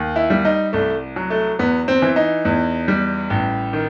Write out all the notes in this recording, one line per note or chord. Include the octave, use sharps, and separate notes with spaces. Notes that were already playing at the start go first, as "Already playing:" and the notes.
Already playing: D#2
E4
G3
D#4
C2 A3
F#3
A3
E2 B3
C4
E3
D#4
E2
G3
A1
D#3